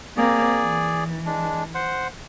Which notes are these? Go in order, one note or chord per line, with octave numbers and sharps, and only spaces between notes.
A#3 C4 G#4 D5
E3
G#3 D4
C5 F#5